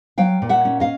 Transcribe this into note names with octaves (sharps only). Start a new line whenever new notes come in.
F#3 F5 G5
A#2
E5 F#5
C#4
D#5 F5